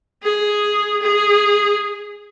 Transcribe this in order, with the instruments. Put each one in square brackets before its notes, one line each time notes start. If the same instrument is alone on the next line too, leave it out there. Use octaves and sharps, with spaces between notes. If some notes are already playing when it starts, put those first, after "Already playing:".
[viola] G#4
G#4